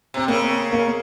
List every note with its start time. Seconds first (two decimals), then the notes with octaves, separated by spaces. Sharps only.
0.14 C3 C4
0.28 C#3 A#3
0.72 A#3